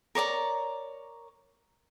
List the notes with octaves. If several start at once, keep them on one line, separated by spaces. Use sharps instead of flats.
A#4 C#5 D5 A#5